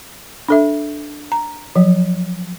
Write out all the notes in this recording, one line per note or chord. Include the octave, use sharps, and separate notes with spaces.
D4 A4 E5
A#5
F3 F#3